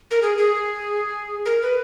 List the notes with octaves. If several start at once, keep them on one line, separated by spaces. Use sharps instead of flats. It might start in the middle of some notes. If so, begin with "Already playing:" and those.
A#4
G#4
G#4
A#4
B4